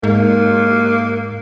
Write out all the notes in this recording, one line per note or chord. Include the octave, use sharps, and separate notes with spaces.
G#2 A#3